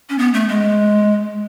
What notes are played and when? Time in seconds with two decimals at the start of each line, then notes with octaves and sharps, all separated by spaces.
0.09 C#4
0.19 B3
0.34 A3
0.49 G#3